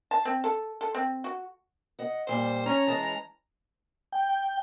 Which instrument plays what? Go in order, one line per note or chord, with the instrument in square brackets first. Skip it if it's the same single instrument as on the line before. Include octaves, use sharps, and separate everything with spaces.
[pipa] A5
C4
A4
A4
C4
F#4
[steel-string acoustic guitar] D#5 F#5
[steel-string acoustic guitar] F2 A#2 G3 [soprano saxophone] C5
[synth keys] C#4 C#5 [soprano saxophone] A#5
[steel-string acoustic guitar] E3 G#3 C#4 [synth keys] A5 A#6
[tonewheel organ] G5